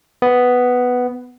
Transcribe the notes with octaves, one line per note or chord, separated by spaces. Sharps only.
B3